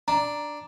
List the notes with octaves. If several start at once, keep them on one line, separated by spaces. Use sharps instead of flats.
D4 A#5